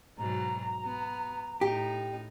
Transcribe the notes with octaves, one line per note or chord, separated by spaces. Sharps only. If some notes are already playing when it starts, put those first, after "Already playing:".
G#2 B2 F#3 A#5
B3
A2 D#4 G4